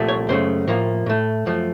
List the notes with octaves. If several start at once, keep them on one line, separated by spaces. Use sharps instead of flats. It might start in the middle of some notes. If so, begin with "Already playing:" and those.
Already playing: C2 A#2 F3 A3
C#5
F#2 C#3 A3 C5
A2 F3 A#3
A2 A3
F#2 F3 A3